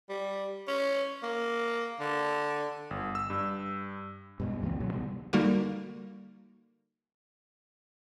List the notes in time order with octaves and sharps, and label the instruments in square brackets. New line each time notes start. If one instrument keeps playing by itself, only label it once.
[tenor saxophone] G3
C#4
A#3
D3
[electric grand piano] G1
E6
G2
[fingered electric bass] G2 B2 G#3
C#2 E3 A#3 C4
A1 B2 D3 F#3
C3 G3 B3
[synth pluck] D3 G3 A#3 D#4 F#4 A#4